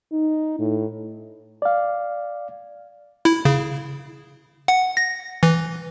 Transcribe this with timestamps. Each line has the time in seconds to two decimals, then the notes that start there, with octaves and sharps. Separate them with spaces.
0.12 D#4
0.59 A2
1.62 D5 F5
3.25 E4
3.45 C#3
4.68 F#5
4.97 A#6
5.43 E3